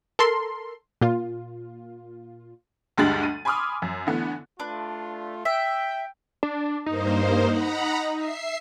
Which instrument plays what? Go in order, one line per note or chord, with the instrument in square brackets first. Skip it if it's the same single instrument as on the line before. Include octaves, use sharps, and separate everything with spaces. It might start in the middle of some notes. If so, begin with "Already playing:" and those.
[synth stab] A4 A#4 C6
A#2 F4
[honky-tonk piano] D2 G2 G#3 G4 A6 F#7
D#7
G#5 B5 C6 D6 D#6 F6
F#2
D3 E3 A3 B3
[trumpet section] A3 F4 [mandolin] D4 B4
[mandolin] E5 [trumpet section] G5
[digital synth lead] D4
[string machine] G2 A#3 C5 [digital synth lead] D#4
[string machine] F#5 A#5 B5
E5 C7